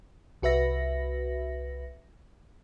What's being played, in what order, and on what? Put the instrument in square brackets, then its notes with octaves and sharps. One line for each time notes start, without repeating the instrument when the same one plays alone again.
[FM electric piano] C2 F#4 B4 E5 A#6